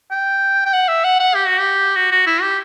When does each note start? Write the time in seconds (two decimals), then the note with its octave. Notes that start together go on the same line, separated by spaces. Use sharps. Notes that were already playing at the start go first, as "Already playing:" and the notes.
0.11 G5
0.65 G5
0.73 F#5
0.88 E5
1.04 F#5
1.20 F#5
1.35 G4
1.47 F#4
1.60 G4
1.96 F#4
2.11 F#4
2.26 E4
2.42 G4